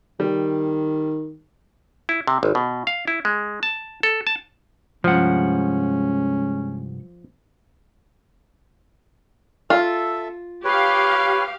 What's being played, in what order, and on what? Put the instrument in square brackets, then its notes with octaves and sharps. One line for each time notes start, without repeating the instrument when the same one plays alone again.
[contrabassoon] D#3 [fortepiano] G3
[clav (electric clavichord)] E4
C3
G#1
B2
F5
E4
G#3
A5
A4
A5
[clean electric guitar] C2 G2 F#5 [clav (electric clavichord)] F3 [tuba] G#3 [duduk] C#4
[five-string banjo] F4 [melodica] A4 E5
[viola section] G4 F5 [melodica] B4 C#5